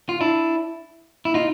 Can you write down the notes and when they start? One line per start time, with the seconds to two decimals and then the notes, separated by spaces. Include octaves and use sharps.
0.09 F4
0.21 D4 E4
1.25 E4
1.34 D#4 F4